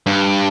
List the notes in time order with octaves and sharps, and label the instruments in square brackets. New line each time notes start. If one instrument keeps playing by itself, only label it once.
[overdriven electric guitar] G2